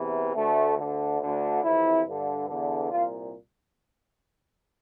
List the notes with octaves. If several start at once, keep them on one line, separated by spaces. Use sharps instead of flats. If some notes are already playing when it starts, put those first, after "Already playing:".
Already playing: E2 C3 E3
D2 D3 A3
D2 D3
D2 D3
F2 C3 E3 E4
G2 D3
E2 D3
C2 A#2 F4